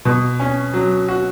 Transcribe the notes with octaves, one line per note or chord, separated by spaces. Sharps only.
B2
C#4
F#3
F#4